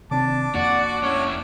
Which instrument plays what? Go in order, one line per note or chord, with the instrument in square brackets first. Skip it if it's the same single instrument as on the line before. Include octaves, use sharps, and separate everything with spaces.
[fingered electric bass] C3 D#3 C4 [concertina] D4 D6 [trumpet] A5
[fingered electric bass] F2 A#3 [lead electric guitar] F#4 [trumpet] D5
[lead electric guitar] C#4 E4 [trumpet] C#5